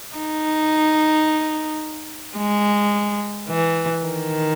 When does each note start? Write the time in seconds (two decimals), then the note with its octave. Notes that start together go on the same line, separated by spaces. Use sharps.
0.16 D#4
2.38 G#3
3.49 E3
4.05 D#3